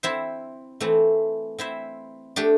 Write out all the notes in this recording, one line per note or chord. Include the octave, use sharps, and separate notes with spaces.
C4 E4 C5 E5
E3 A3 C4
C4 E4 C5 E5
A3 D4 G4